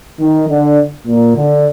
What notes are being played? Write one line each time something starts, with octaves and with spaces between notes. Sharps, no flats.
D#3
D3
A#2
D3